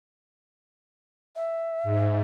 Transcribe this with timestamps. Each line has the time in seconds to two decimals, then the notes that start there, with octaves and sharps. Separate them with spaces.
1.36 E5
1.83 G#2